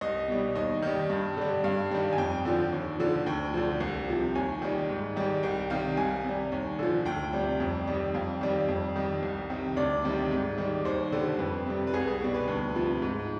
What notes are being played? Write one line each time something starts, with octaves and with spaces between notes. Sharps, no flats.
C2 D#5
B2 G3
D#2 D#5
D#3 G3
G2
D3 G3
G2 F5
D#3 G3
G#5
F2 G5
D3 F3
D#2
D3 F3
D2 G5
D3 F3
C2
C3 F3
D#2 G#5
D#3 G3
G#2
D#3 G3
C2 G5
C3 D#3 G3 F5
C2 G#5
C3 G3
D#2
D3 F3
D2 G5
C3 G3
F2
D#3 G3
F2 F5
D#3 G3
F2
D#3 G3
C2
C3 D#3
D2 D5
C3 D#3 G3
G#2
D#3 G3
D#2 C5
D3 G3
F2 B4
C3 G3
B4
C2 G#4
G#4
B2 G3
B4
D2
C3 F3
G#2